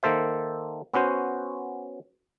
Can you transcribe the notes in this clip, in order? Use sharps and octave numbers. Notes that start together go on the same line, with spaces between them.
D#3 A#3 A4 C5 E5
B3 C#4 F#4 C5